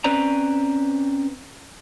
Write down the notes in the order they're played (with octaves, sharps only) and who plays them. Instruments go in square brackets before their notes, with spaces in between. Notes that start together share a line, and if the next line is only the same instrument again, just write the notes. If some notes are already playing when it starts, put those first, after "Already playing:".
[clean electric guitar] C4 C#4 B4 C5 D5 A#5